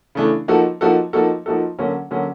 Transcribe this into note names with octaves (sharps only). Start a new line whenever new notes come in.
C#3 E3 A3 D4
F3 A#3 D#4 F#4 A4
F3 A#3 D#4 F#4 A4
F3 A#3 D#4 F#4 A4
F3 A#3 D#4 F#4 A4
D3 F#3 A#3 C#4
D3 F#3 A#3 C#4